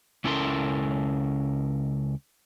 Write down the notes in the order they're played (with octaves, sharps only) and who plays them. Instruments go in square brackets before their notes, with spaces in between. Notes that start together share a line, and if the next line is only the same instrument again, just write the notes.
[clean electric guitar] C#2 C#4 E4 A4 A#4 C6